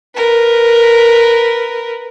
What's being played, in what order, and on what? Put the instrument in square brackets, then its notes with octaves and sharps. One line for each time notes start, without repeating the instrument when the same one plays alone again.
[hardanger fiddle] A#4 B4